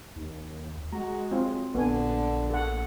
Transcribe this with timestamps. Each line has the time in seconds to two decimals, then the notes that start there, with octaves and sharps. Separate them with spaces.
0.16 D#2
0.93 G#3 F#4 A#5
1.31 F#3 C4 F4
1.75 A#1 D3 B3 G#5
2.50 A4 F#5